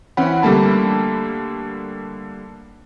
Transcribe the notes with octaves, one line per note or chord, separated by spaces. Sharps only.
E3 C4 C#4 F#5 B5
D3 G3 A3 A#3 A5 B5